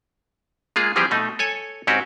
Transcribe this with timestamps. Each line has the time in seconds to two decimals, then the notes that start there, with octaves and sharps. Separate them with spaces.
0.76 G#3 A#3 F4 G#4
0.96 E3 F3 G3 C4 G4 G#4
1.11 B2 A3 D#4
1.39 A4 C#5 G#5
1.87 G#2 C4 C#4 F#4 G4